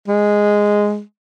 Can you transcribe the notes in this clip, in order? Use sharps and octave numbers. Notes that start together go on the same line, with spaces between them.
G#3